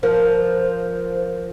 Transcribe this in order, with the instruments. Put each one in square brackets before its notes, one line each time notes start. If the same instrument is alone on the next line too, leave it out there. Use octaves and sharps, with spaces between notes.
[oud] F3 [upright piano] A#4 [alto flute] C5